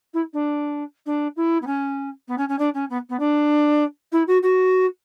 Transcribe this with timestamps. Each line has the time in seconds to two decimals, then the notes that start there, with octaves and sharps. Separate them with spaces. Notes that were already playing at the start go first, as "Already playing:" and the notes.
0.13 E4
0.33 D4
1.06 D4
1.36 E4
1.62 B3
1.66 C#4
2.28 B3
2.38 C#4
2.48 C#4
2.58 D4
2.74 C#4
2.89 B3
3.09 B3
3.19 D4
4.12 E4
4.27 F#4
4.42 F#4